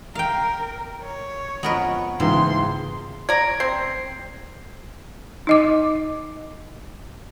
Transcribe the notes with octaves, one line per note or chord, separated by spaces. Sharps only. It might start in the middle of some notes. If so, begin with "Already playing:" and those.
A#4 F5 G5
C#5
F2 B3 A#4 B4 D#5
C#2 G#2 E3 A#3 C6
D5 A#5 G#6 D7
C4 C7
D#4 D#5 D6